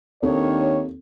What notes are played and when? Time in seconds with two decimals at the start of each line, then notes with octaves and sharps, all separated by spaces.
0.23 D#2 D#3 C4 D4 A4 C#5